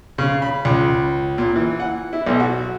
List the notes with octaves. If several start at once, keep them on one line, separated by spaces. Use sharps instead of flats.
C#3
B5
C#2
A#2
E3
F#5
E4
B1
F#4